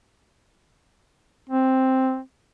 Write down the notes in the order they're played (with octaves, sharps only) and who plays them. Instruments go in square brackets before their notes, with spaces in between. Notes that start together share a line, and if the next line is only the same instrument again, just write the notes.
[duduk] C4